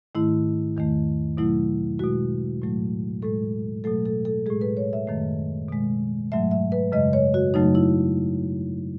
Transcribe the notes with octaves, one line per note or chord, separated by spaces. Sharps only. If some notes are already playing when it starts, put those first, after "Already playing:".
G#2 D#3 A3 E4
E2 D#3 A3
B2 F#3 A3 E4
B2 G#3 F#4
A2 F#3 A3
A2 G#3 A4
B2 F#3 A3 A4
A4
A4
A2 G#3 G#4
B4
C#5
E5
F#2 D#3 A3
B2 G#3
G#2 F#3 A3 E5
E5
B4
F#2 C#3 G#3 D#5
C#5
F#4
F#2 C#3 F#3 A3 D#4
E4